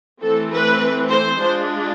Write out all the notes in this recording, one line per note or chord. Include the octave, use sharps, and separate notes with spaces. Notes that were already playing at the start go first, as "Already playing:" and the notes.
E3 A3 C4 A4
B4
C5
G#3 D4 F4